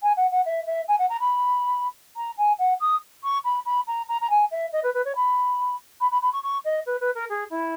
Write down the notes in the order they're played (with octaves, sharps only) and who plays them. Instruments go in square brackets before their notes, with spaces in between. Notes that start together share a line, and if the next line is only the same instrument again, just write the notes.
[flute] G#5
F#5
F#5
E5
E5
G#5
F#5
A#5
B5
A#5
G#5
F#5
D#6
C#6
B5
B5
A#5
A#5
A#5
G#5
E5
D#5
B4
B4
C#5
B5
B5
B5
B5
C#6
C#6
D#5
B4
B4
A#4
G#4
E4